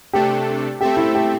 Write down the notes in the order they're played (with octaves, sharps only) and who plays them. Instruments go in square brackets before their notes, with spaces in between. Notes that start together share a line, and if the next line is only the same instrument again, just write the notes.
[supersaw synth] C3 A3 D4 A4 [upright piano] G4
[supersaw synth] A3 C4 A4 E5 [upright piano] G4
[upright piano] E4
G4